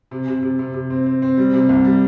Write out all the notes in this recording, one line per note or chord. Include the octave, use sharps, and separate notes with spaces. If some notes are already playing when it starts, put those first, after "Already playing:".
C3
C3
C3
C3
C3
C4
C4
C4
G3
C3
C2
G3